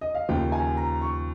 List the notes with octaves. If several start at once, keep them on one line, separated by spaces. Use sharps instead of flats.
D#5
F5
D#2 C#3 F3 G5
G#5
A#5
C#6